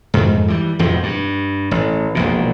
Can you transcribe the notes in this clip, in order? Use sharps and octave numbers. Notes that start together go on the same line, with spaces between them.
F2 G#2
E3 G3
E1 F2 A2 F3
G2
A1
E1 A#1 A#2